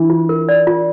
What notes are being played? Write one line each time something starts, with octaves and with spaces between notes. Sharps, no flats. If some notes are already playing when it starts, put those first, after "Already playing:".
Already playing: E3 D4
F4
A#4
D5
F4